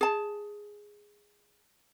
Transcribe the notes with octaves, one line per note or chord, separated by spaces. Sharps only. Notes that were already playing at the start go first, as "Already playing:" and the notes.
G#4 A5